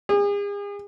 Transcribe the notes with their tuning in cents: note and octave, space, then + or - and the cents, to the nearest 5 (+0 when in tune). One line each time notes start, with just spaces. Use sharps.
G#4 -40